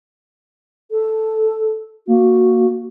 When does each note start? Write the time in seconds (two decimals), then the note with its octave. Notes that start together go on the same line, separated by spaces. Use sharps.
0.91 A4
2.08 A#3 F#4